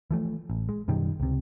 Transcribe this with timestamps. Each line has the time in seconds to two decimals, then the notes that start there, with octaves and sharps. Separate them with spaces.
0.11 E3 F3 A3
0.50 A1
0.69 G#3
0.88 F#2 B2 D#3 G3
1.20 C#2 C3